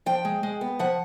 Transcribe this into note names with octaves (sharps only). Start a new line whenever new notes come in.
F3 G5
G#3
G#3
B3
F3 F#5